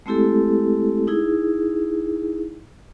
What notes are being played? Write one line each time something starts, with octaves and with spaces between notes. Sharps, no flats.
G#3 A3 C4 E4 G4 A4
D#4 E4 G#4